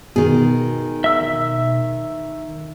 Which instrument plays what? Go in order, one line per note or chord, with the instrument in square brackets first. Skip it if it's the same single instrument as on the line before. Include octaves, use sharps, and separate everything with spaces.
[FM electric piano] B2 [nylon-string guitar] D#3 G#4
[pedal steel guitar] E5 E6